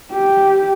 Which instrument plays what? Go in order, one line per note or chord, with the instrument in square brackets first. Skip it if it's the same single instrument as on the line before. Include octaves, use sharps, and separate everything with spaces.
[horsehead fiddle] G4